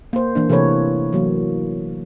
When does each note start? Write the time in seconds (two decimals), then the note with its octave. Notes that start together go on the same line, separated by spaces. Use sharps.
0.13 A#3 C5
0.35 E3 A#3 D4
0.49 C3 E3 A3 A4 B4 C#5
1.13 E3 F#3 A#3